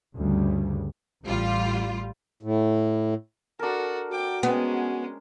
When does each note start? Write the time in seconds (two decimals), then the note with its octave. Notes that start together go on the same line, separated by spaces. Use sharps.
0.16 D2 G2 C#3 G3
1.25 A1 G3 F4
2.43 A2
3.59 D4 F#4 A4 A#4
4.11 F#4 G5 D6
4.43 G#3 B3 C#4